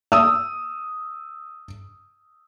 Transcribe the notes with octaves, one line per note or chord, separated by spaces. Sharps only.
D#6 E6